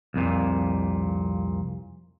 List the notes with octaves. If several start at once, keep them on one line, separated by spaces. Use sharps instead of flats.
C2 F2 A#2